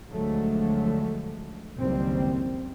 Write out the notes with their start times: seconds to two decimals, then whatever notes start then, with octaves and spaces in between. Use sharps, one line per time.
0.12 D2 D3 F3 F#3 G#3 A3
1.79 F#1 C#2 D#3 G3 C4